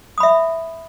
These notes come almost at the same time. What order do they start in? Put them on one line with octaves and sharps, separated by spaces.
D#6 B5 E5